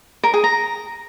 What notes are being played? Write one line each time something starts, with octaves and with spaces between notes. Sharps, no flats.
A#4
G#4
A#5